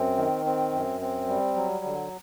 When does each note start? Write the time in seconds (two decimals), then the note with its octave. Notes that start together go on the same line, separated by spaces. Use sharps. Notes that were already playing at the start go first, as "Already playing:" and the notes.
Already playing: F#2 C4
0.17 D#3
0.46 C4
0.72 F#2
1.01 C4
1.28 G3
1.56 F#3
1.85 D3